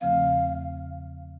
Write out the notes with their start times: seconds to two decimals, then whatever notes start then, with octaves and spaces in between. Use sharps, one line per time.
0.01 E2 C#3 F3 A3 C4 F5